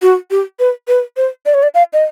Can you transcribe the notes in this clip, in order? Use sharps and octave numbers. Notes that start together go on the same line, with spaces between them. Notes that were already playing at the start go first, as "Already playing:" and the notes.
F#4
G4
B4
B4
C5
D5
C#5
D5
F5
D#5